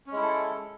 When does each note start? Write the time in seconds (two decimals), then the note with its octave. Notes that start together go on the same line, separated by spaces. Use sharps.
0.07 C#4
0.12 G#3
0.17 E4
0.21 A4